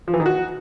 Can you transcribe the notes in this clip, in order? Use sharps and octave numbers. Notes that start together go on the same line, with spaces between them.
F3
E3
D#3
F#4